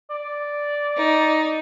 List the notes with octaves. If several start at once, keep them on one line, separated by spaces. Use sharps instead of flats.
D5
D#4